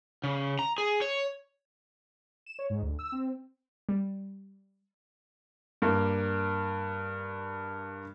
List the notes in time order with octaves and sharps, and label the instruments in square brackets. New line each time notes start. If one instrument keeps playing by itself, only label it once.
[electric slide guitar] C#3
A#5
G#4
C#5
[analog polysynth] E7
C#5
G#2
D2
E6
C4
[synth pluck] G3
[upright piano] G2 A#3